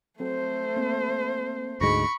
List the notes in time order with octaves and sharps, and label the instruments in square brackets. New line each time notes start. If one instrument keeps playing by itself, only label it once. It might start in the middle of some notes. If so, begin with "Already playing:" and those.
[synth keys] F#3 C4 A4 [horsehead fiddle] A3 C5
[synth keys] A#3 C4
[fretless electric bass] D2 G#2 G#3 [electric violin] B5 C#6 [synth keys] A#6 C#7 D7